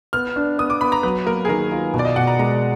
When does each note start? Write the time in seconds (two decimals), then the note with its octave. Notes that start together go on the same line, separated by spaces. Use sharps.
0.13 B3 F6
0.36 D4
0.58 B3 D#6
0.70 D6
0.81 B3 B5
0.92 A#5
1.03 F#3 B4
1.26 A#3 A#4
1.45 G#4
1.49 D#3 A#4
1.72 F4
1.94 B2
1.99 D5
2.05 D#5
2.16 B2 F#5
2.27 A#5
2.39 G#3 A#5